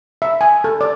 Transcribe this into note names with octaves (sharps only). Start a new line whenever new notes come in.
E5
G#5
A4
D5